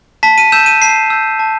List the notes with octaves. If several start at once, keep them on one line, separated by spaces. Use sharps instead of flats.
A5 B6
D#7
E6 G6 E7
D#7
A5 C7
E6 G6
A5